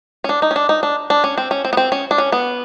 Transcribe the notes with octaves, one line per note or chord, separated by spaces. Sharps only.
C#4
D4
D#4
C#4
D4
D#4
D4
D4
C#4
C4
C#4
C4
B3
C4
C#4
D4
C#4
B3